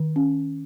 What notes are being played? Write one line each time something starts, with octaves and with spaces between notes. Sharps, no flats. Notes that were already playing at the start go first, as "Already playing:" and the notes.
Already playing: D#3
C#4